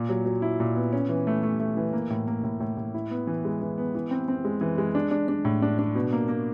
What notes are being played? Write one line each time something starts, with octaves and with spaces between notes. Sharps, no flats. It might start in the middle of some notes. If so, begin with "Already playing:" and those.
Already playing: A#2
F#3
F#3
E4
A#2
B3
C#4
E3
A3
A3
A3
E3
A#3
A2
A#3
A2
A2
A2
E4
B3
E3
G#3
E3
B3
E3
C4
C4
G#3
E3
G#3
D4
D4
D4
A2
D4
D4
B2
A#3
A#3